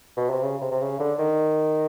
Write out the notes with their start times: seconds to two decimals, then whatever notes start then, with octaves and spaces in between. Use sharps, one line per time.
0.17 B2
0.30 C3
0.42 C#3
0.61 C3
0.71 C3
0.81 C#3
1.00 D3
1.19 D#3